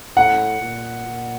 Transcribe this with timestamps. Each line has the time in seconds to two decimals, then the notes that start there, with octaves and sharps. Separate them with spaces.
0.16 A2 F#5
0.61 A#2
1.07 A#2